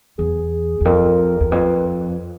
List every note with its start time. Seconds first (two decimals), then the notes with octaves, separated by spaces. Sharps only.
0.18 E2 G#4
0.81 E2
0.85 F2 A#4
1.41 E2
1.51 F2 B4